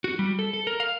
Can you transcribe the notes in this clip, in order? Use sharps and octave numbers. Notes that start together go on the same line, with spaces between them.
F#4
G3
A4
A4
A#4
F5